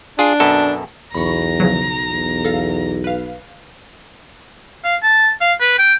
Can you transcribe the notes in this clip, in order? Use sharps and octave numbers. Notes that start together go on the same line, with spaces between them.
D4 F4 G#4
F#2 B2 A4
B1 E2 A#5 B5 C#6
C#3 F3 F#3
E2
A4 F5
B4 F5
F5
A5
F5
B4
G5